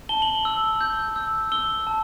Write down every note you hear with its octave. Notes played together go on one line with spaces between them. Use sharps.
A5 G7
F#7
G7
E6
G6
E6
E6 G7
A5